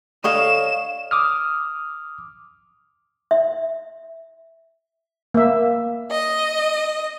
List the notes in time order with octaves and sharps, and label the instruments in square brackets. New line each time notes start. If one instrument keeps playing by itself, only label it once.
[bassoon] D3 [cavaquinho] C#5 D#5 F5 [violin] E7
[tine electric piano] D6 D#6 F6
[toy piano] E5
[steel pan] A#3 E5
[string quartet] D#5